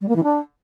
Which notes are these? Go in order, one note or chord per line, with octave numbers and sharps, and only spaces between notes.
G3
A#3
E3
D4